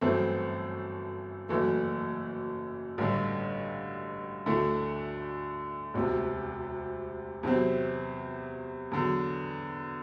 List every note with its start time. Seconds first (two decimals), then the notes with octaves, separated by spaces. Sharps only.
0.01 G1 F#2 E3 A3 C4
1.49 F#1 F#2 E3 A3
2.98 A1 G2 D3
4.46 D2 D3 A3 E4
5.94 E1 D2 C3
7.43 E2 C3 F#3 C4
8.91 E2 D3 F#3